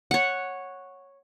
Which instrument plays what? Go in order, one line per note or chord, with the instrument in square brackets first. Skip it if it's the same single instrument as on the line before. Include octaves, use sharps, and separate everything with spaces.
[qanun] C#5 F#5